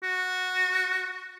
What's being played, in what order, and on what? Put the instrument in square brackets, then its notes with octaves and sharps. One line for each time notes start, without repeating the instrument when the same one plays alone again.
[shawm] F#4